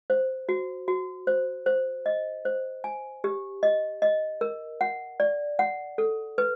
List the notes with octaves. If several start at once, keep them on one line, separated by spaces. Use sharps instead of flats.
C5
F#4
F#4
C5
C5
D#5
C5
G#5
G4
D#5
D#5
A#4
F#5
D5
F#5
A4
B4